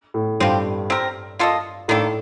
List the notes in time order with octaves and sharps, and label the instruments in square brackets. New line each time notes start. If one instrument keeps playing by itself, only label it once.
[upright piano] A2
[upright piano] G2 [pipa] F3 C4 G4
[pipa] C4 G4 A#4
A#3 F4 A4 D#5
[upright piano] A2 [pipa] D#3 A#3 D4 A4